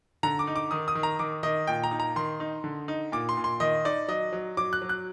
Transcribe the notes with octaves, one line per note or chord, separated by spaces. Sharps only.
D3 A#5
D6
D#4
D6
D#3 D#6
D#6
D#3
A#5
D#3 D6
D#3 D#5
A#2 G5
A#5
D#4
A#5
D#3 C6
D#4
D3
D#4
A#2 D6
C6
A#2
C6
D#3 D#5
D#4 D5
F#3 D#5
F#3
F#3 D6
F#6
F#3
F#6